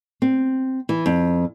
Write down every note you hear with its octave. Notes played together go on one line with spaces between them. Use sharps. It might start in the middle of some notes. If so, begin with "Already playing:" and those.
C4
E3
F2